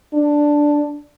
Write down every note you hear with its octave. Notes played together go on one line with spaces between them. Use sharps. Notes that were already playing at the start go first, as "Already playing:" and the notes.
D4